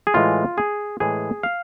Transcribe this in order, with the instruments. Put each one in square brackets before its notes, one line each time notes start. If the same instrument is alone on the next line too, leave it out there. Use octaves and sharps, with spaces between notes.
[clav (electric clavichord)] G#4
A2 E3 G#3 F4
G#4
A2 E3 G#3 G#4
F5